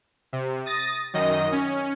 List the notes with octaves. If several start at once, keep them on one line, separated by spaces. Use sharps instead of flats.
C3
D#6 A6 A#6
F#2 D#3 D#5 A#6
C#4